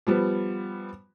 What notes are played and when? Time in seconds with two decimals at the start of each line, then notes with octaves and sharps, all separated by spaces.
0.07 F3 G3 B3